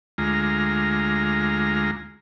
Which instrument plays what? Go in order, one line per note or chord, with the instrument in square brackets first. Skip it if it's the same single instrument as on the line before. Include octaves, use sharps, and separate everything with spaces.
[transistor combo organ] D2 G#3 F4 A#5